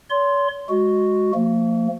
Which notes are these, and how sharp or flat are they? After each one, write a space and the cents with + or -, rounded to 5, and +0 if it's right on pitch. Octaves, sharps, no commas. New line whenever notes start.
C#5 +40 C6 +0
G#3 +0 F#4 +0
F3 +0 A#3 -40